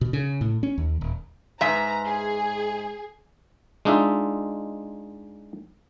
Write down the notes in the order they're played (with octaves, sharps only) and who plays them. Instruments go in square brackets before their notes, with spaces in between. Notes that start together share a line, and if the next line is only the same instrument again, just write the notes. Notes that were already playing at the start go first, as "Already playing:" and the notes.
[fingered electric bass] B2
C#3
A2
C#4
D#2
D#1
[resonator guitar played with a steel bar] G#2 E5 [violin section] B4 A#5
[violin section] G#4
[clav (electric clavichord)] G#3 D4 D#4 F4 E5